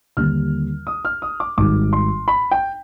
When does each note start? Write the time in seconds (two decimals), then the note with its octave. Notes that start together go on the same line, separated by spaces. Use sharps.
0.17 D#2 D3 G3 F6
0.87 D#6
1.05 F6
1.22 D#6
1.40 D6
1.57 G#1 G#2 D#3 G3 D6
1.93 C6
2.28 B5
2.51 G5